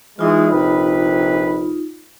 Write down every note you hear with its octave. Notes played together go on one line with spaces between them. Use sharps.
E3 G#3 D#4 F4
A#1 C3 B4